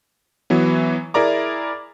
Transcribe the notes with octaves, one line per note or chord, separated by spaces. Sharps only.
E3 F#3 B3
E4 G#4 A#4 D5 A#5 D6